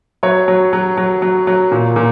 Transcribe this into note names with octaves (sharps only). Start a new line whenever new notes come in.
F#3 C#5
F#3
F#3
F#3
F#3
F#3
A#2
A#2